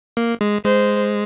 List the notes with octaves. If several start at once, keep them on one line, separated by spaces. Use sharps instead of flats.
A#3
G#3
G#3 C5